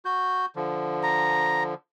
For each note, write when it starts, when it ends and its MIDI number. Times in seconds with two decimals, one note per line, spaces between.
0.05 0.46 66
0.05 0.46 91
0.56 1.74 50
0.56 1.74 53
1.03 1.64 82